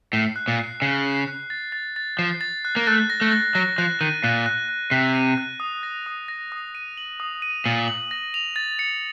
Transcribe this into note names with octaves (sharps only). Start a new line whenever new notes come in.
A2 C7
F#6
A#2
C7
C#3 C7
C7
F#6
A6
A6
A6
F3 C7
A6
F#6
A#3
A3 F#6
A#6
A3
A#6
F#3 A#6
F3 F#6
D#3 D#7
A#2 F#6
F#6
F#6
C3 F#6
D#7
F#6
D#6
A#6
D#6
A#6
D#6
D#7
F#7
D#6
D#7
A#2 F#7
F#7
A#6
F7
A6
C#7